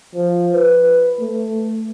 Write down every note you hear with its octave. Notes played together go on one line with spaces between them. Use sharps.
F3
B4
A3